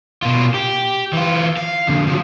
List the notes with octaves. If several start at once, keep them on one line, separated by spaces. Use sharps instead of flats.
B2 F4
G4
E3 F4
F5
F2 D3
F3 F#3